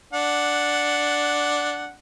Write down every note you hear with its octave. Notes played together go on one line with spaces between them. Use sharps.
D4 F#5